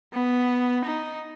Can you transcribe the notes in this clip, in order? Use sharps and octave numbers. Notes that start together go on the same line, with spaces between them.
B3
D#4